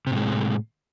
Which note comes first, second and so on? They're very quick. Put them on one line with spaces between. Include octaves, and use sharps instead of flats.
C3 A2 G#3